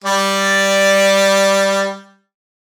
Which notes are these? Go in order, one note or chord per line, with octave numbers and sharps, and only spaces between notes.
G3 D5